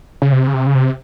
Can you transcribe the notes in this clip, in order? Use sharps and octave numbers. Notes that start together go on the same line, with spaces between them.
C#3
C3
C#3
C3
C#3
C3